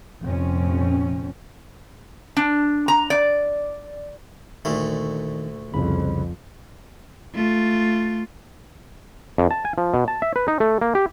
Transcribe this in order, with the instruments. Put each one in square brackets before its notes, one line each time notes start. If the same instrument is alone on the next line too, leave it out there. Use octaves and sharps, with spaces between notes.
[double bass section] F1 F2 A#2 C4 C#4
[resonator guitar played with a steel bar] D4
A#5
D5
[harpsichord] D2 A#2 A3 [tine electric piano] D#3
[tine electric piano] C2 C#3 B5 [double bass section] F2
[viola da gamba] A3 F4
[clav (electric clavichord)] F2
A5
G#5
F3
B2
A5
E5
B4
D#4
A3
A#3
G4